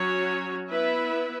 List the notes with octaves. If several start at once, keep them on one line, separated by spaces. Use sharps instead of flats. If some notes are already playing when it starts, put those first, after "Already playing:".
Already playing: F#3 C#4 F#4 C#5
B3 E4 B4 E5